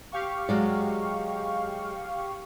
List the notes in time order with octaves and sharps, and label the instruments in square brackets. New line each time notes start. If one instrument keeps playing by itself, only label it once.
[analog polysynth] G4 F5 C#6
[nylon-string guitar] F#3 G#3 D5